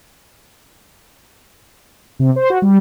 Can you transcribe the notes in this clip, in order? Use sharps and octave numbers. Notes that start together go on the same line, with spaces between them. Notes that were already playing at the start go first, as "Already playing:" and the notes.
C3
C5
F#4
G3